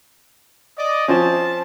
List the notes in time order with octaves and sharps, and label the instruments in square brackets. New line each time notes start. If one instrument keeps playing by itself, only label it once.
[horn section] D5 D#5
[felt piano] F3 C4 C#4 [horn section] C5 A5